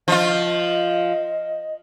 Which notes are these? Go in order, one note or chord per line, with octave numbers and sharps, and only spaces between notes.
F3 F4 D#5